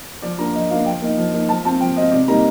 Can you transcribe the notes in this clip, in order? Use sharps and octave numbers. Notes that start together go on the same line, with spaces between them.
F3 D5
A#3 D4 F4 A#5
F3 D#5
A#3 D4 F4 F5
F3 G5
A#3 D#4
F3
A#3 D#4
F3 A5
C4 F4 A5
F3 G5
C4 F4 D#5
C3 D5
G3 A#3 D#4 A#5